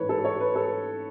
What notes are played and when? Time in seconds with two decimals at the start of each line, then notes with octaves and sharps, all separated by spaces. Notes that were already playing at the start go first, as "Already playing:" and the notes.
Already playing: A1 G#2 E3 A3 B4 C#5
0.09 A4
0.25 C#5
0.40 B4
0.55 A4